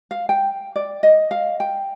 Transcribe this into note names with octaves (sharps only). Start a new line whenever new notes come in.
F5
G5
D5
D#5
F5
G5